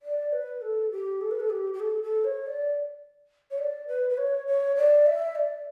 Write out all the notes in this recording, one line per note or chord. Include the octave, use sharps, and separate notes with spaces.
D5
B4
A4
G4
A4
B4
A4
G4
G4
A4
A4
C#5
D5
C#5
D5
B4
B4
C#5
C#5
D5
E5
D5